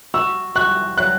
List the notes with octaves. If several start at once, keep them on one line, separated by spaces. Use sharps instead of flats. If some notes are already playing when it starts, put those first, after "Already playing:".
F#4 E6
F#4 F#6
F#3 F#6